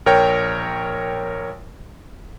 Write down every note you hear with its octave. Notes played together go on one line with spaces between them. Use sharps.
A#1 A#4 C#5 G5